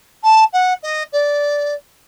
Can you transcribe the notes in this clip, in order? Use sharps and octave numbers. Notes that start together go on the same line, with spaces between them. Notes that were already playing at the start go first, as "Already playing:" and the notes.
A5
F#5
D#5
D5